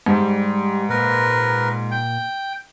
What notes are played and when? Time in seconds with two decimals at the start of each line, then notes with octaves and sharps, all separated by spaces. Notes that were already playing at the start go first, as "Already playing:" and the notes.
0.06 G#2 G3
0.89 A#2 A#4 B4
1.91 G5